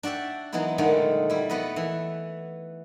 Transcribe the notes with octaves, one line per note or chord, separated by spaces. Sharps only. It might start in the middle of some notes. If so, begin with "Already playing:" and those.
D4 F#4 D5 E5 G5
E3 F#3 G#3 B3 D#4 E4
A#2 D3 D#3 F#3 G#3 A3
G3 E4
A3 B3 B4 D5 D#5
E3 E5